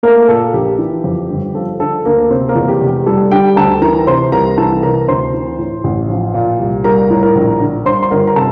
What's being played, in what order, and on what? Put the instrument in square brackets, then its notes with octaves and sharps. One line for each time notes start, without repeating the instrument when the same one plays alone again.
[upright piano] A3 A#3 A#4
A#2 A4
A#1 G4
E3
F2
G1
F3 A4
D3 A4
D2 A#3 A#4
C3 C4 C5
A#3 A#4
E2
G4
F1
G4
G3 A4
D3 G4 G5
D2 A4 A5
E3 A#4 A#5
C3 C5 C6
C2 A#4 A#5
E3 A4 A5
C3 A#4 A#5
D2 C5 C6
E3
A2
A1
F3
A#2
C2
G3 A#4 A#5
A2
A#4 A#5
A#1
D3
G2 C5 C6
C6
G1 A#4 A#5
A#5
C3 A4 A5